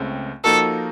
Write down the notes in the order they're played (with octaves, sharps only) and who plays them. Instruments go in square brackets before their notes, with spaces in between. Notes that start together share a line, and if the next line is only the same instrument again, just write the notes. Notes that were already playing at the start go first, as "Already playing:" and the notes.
Already playing: [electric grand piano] C#2 C#3 A3 C4
[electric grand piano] F3 A#3 D#4 F#4 A#4 [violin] A4